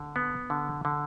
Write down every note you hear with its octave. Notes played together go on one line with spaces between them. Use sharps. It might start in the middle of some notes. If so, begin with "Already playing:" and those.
Already playing: D3
B3
D3
D3